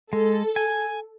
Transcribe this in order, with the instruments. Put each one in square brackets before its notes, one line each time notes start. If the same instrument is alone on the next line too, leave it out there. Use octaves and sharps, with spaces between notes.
[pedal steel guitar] G#3 [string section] A4
[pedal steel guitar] G#5